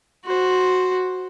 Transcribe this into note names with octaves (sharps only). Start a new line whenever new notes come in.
F#4 C5